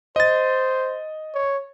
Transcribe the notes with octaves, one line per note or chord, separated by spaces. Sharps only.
C5 D#5 A6
C#5